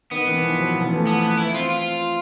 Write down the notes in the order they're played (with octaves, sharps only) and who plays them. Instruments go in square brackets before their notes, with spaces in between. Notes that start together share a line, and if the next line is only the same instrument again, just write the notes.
[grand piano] D#3 [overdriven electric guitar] B3
[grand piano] E3
F3
F3
F#3
F3
E3
A3
[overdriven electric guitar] B3
B3
E4
[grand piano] C4 [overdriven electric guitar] F4
[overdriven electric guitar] F4